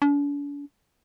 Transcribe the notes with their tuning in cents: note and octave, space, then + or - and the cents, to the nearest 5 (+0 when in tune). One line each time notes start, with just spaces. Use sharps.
D4 -45